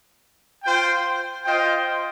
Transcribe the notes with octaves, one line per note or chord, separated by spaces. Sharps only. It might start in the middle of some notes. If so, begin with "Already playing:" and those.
F4 C5 G5
F4 C5 D#5 G5